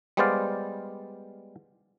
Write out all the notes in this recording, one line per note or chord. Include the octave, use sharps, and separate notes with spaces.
G3 G#3 B3 C5 D5 F5